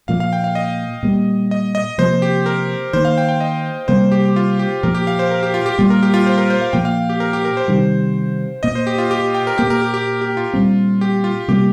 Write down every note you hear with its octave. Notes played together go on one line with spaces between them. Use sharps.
A#2 F3 A#3 F5
F5
G5
F5
D#5
A#2 G3 A#3
D#5
D#5
C3 F3 A#3 C5
G4
A#4
D#3 A#3 C5
F5
G5
G5
D#5
C3 G3 A#3 C5
G4
G4
F4
G4
A#2 F3 A#3 A#4
G4
F5
C5
A#4
G4
F4
G4
A#2 G3 A#3 F4
A#4
G4
F4
C5
A#4
C5
F5
A#2 F3 A#3 G5
F5
G4
A#4
G4
A#4
C5
C3 D#3 G3
A#2 A#3 D#5
C5
G4
F4
G4
G5
A#4
A#2 A#3 G4
A#4
G4
G4
G4
F4
A#2 G3 C4
G4
F4
C3 G3 A#3 G4